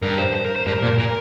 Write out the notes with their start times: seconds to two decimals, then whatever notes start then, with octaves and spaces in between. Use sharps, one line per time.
0.03 G2 A#4
0.19 C5
0.35 C5
0.46 A#4
0.56 C5
0.67 G2 A#4
0.82 A#2
0.98 A#2 A#4